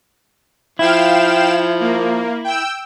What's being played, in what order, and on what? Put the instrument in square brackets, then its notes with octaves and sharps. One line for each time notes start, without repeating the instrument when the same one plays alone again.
[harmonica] F3 [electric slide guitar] E4 [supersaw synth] F5 G5 E7
[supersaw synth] A#3
G5 E6